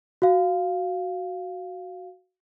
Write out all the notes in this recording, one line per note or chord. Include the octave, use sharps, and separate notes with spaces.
F#4 F5